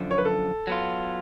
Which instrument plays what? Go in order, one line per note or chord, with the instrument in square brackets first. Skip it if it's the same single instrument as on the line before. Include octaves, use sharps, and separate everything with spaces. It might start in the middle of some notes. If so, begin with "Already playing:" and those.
Already playing: [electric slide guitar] F#2 D3 F3
[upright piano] C#5
B4
A4
[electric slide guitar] F#3 B3 F4